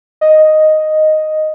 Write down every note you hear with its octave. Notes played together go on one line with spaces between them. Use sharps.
D#5